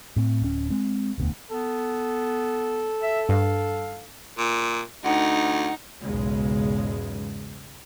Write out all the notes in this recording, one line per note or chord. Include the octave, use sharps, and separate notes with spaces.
A2 C4
D1 C#4
G#3 C4
E1 D2 B3
B3 A4
E5
G2 F5
A#2
D2 D#4 F#5
B1 E2 G#2 C#3 G#3